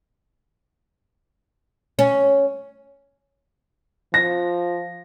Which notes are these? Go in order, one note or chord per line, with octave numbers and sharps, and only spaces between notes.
C#4
F3 A#6